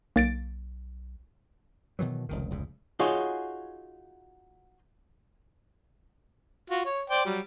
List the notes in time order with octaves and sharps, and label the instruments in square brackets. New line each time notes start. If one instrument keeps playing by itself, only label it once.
[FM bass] B1 [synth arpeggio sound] A#3 A6 D7
[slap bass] B2 D#3 E3 F#3
F1 C#2 D#3
F1 C#2 G#2
[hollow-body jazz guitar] D#4 F4 F#4 G#4 C#5
[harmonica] F4 F#4
C#5
C5 D5 G5
F#3 G3